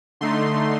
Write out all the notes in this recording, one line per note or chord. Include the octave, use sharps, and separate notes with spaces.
D3 A3 D#4 C6